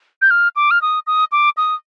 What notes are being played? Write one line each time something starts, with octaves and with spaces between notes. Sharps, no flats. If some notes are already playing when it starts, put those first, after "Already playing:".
G6
F6
D6
F6
D#6
D#6
D6
D#6